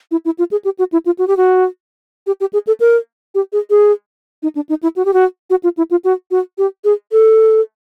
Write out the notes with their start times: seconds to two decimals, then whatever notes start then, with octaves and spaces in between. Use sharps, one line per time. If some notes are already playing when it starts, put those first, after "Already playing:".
0.11 E4
0.25 E4
0.39 F4
0.51 G#4
0.65 G4
0.79 F#4
0.92 E4
1.06 F4
1.19 F#4
1.28 G4
1.37 F#4
2.27 G4
2.41 G4
2.53 G#4
2.67 A4
2.80 A#4
3.35 G4
3.53 G#4
3.70 G#4
4.43 D#4
4.55 D4
4.69 D#4
4.83 E4
4.96 F#4
5.05 G4
5.14 F#4
5.50 F#4
5.64 F4
5.77 E4
5.91 F4
6.04 F#4
6.31 F#4
6.58 G4
6.84 G#4
7.12 A4